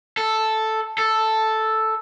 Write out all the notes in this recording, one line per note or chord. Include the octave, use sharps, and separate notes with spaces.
A4
A4